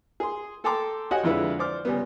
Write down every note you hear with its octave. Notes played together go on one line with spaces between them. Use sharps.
G#4 C6
A4 G5 A5 A#5 C6 D6
F#4 G4 C#5 D#5 F#5 G#5
F2 D3 G#3 E4 F4 B4
C5 D5 D6 F6
C#2 G3 B3